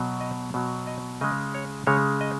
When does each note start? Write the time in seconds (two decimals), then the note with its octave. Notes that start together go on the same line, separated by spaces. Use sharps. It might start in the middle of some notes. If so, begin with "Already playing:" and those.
Already playing: B2 F#3
0.21 D#5
0.54 B2 F#3
0.87 D#5
1.21 C#3 G#3 D#5
1.54 C#5
1.87 C#3 G#3 C#5
2.21 D#5